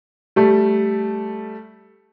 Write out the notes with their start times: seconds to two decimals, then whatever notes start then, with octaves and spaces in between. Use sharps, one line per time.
0.36 G3 A3